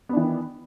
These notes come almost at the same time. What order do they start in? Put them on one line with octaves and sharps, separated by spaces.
B3 D4 E3 D#3